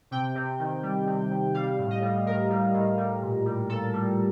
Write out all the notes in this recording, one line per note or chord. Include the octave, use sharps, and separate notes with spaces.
C3 G5
C3
D#3
G3
C3
C3
G3 F5
A2
D#5
G3
A2 A#4
G3
A2
G3
A#2
G3
A#2 A4
G3